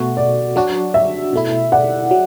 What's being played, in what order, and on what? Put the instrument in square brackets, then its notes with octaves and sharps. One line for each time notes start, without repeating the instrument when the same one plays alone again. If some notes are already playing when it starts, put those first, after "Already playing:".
Already playing: [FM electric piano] B2 A3 F#4
[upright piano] D5
[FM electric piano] F#3 D4 F#4
[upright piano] E5
[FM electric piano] B2 A3 E4
[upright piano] D5 F#5
[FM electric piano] F#3